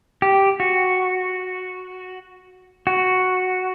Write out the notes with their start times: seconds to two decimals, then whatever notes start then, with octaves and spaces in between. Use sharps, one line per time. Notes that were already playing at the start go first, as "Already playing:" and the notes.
0.22 G4
0.60 F#4
2.87 F#4